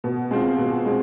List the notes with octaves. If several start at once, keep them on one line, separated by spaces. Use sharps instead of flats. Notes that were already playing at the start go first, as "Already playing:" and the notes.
B2
G#3 C4 F4
B2
G#3 C4